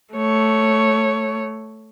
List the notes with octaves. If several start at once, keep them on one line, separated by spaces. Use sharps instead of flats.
A3 C#5